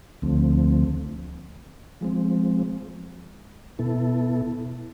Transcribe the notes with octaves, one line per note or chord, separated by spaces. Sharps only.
D2 D3 F3 A3 C4
F3 G#3 C4
B2 B3 E4 A4